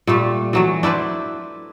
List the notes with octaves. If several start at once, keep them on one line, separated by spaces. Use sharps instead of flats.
A#2 G3 A3
E3 F#3 A3
D4 E4 B4 C5